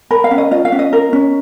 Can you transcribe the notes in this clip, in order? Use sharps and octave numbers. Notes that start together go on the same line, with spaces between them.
A#4 B5
F5
C#4
D#5
F4 D#5
F5
C#4
D#5
A#4
C#4